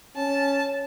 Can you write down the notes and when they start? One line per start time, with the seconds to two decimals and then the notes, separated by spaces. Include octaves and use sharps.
0.16 C#4 A5